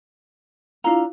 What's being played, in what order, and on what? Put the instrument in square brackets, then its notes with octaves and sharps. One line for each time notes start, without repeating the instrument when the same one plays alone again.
[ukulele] D4 A#5 [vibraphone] E4 F4 F5